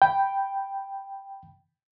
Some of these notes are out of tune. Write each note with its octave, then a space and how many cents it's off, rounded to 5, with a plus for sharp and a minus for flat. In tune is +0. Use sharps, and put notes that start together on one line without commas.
G5 +0 B5 +0